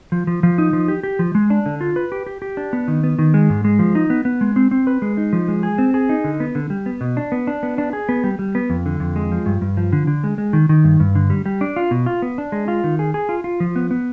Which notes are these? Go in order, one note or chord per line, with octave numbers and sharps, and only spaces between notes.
F3
F3
F3
D#4
F3
G4
G4
F3
G#3
D4
D3
F4
B4
G4
G4
G4
D4
B3
D#3
B3
D#3
G#3
G#2
G#3
F3
D#4
B3
B3
G#3
C4
C4
B4
G#3
D#4
F3
G#3
G#4
C4
G#4
D#4
D3
B3
D3
G3
B3
B2
D4
B3
D4
B3
D4
G#4
B3
G3
G3
B3
F2
D3
F2
G#3
F3
G2
G2
F3
D3
D3
G#3
G#3
D#3
D#3
G2
G2
D3
G3
G3
D4
F4
B2
F4
B3
D4
G#3
F4
D#3
G#4
G#4
F4
F4
F3
B3
B3